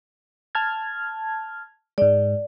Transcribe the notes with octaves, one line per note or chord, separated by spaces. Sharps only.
A5 F6 G#6
G#2 G#3 D5